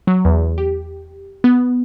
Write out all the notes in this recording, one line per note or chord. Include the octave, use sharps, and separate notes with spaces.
F#3
E2
G4
B3